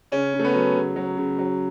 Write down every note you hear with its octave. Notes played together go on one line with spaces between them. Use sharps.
C#3 C#4
C#3
A3
B3
F#3
C#3
F#3
C#3
F#3